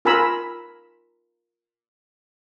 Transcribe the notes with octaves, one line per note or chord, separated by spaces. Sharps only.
F4 A#4 G#5 A#5 B5 E6